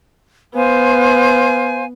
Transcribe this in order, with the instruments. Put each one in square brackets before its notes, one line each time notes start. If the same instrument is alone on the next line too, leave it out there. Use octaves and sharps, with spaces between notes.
[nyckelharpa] B3 [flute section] C5 F5 G#5